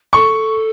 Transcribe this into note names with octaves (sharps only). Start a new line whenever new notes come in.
A4 C#6